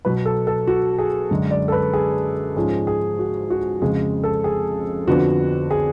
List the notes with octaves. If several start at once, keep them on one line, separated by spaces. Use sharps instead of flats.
B2 F#3 B3 B4
A4
A4
F#4
G#4
F#2 D3 G#3
D5
A4
B4
G#4
G#2 F3 G#3 C#4 G#4
G#4
F#4
F#4
F2 C#3 G#3 G#4
A4
G#4
F2 D3 F3 B3 D4 F#4
G#4